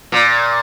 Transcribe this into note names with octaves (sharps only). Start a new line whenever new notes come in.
A#2